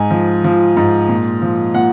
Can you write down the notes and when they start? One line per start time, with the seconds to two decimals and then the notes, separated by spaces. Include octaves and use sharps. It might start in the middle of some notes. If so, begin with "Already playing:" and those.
Already playing: G#2 G#5
0.11 F3
0.44 F3
0.77 G#2
1.09 A#2
1.42 F3
1.74 A#2 F#5